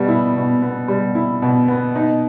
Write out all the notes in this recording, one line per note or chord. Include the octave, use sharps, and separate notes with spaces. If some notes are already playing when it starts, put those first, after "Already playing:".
Already playing: B2 G3 B3
E4
B2
B3
G3
E4
B2
B3
D#4